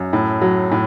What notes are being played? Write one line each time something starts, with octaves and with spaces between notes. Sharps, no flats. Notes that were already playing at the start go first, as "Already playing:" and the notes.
Already playing: F#2
A2
F#3
A2